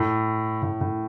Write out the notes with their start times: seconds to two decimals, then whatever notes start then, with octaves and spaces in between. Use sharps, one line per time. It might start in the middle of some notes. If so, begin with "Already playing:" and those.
Already playing: A2
0.62 A2
0.81 A2